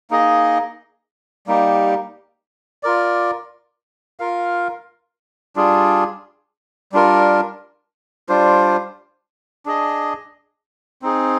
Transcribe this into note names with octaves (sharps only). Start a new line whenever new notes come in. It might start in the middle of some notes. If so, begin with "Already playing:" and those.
A#3 D#4 G#4 D#5
G3 A#3 D#4 G4
F4 A#4 D5
F4 A#4 F5
G3 D4 F4 G#4
G3 D4 F4 A#4
G3 D4 F4 C5
D4 G#4 D#5
C4 D#4 G#4